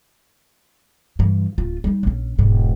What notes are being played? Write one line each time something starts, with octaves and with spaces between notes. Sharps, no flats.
G2 E3
D1 F4
G3 D#4
A#1 C#4
E1 G#2